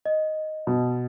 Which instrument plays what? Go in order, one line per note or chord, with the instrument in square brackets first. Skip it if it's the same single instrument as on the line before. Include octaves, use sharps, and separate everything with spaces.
[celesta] D#5
[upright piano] B2